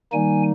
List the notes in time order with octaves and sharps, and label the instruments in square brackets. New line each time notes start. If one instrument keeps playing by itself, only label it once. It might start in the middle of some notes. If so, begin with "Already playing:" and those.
[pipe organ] D#3 G3 A#3 D#4 G#5